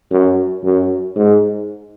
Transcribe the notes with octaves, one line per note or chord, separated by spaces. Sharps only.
F#2
F#2
G#2